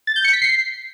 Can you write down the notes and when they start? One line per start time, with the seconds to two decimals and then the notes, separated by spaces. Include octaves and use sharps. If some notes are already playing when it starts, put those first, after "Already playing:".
0.07 A6
0.16 G6
0.24 C#7
0.33 B6
0.42 C7